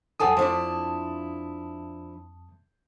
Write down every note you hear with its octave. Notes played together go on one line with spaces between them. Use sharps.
F2 F#3 A4 G#5 A5 D#6
F3 D4 E4